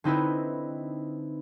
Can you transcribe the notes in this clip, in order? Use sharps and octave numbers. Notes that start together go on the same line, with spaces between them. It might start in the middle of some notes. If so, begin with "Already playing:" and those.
D3 C4 D#4 E4 B4